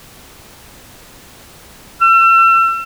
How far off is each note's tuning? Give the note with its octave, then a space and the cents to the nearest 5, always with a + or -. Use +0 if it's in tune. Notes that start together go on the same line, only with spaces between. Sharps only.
E6 +35